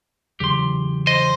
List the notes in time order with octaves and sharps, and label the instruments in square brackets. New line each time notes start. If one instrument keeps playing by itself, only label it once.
[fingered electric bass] E2 C#3 F#3 [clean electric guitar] G4 C6
[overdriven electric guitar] C5 [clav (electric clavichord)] D#5